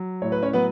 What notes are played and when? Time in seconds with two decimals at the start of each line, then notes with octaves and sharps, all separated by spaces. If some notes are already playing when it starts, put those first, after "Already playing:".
Already playing: F#3
0.22 A2 C#5
0.32 B4
0.42 C#4 C#5
0.53 F#3 B3 B4